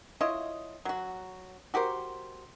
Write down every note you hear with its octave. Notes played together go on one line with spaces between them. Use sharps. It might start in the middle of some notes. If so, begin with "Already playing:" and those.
E4 F4 C#5 D#5
F#3 F#4
F#4 G4 A#4 C5